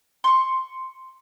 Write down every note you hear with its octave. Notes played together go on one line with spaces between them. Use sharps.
C6 C#6